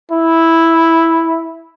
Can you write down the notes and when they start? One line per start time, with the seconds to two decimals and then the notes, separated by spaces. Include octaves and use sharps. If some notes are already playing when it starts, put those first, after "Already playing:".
0.11 E4